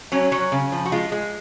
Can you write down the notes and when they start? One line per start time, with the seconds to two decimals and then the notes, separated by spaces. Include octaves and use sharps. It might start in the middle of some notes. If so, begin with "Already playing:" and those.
0.12 F#3 C#4
0.32 F#3
0.52 C#3
0.72 F3
0.85 F#4
0.92 G#3 F4
1.12 G#3